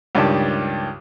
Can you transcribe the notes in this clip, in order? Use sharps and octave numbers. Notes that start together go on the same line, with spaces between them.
C#2 G2 D#3 G4 D5 A5